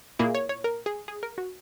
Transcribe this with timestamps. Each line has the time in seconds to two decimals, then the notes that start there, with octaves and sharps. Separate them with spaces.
0.19 A#2 A#3 E4 G#4
0.35 C#5
0.49 C#5
0.64 A#4
0.86 G#4
1.08 G#4
1.23 A#4
1.38 F#4